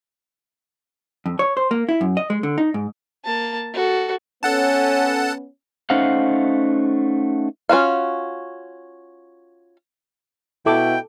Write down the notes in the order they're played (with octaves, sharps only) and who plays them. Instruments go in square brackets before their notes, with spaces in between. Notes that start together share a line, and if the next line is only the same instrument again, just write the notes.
[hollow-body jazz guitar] F2
C#5
C5
A#3
E4
F#2
D#5
G#3
D3
D#4
G#2
[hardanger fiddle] A#3 A5
F#4 A4
[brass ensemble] B3 C#4 [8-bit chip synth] A4 F#5 A5
[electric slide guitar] A3 C#4 D#4 C5 F5 F#5
[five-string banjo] C#4 F4 F#4 F5
[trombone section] B2 [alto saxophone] E4 [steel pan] A4 D6 [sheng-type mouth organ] G5